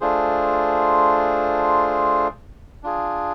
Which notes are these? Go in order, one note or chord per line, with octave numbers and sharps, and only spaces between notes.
A3 D4 F4 G#4 C5
D4 F4 G#4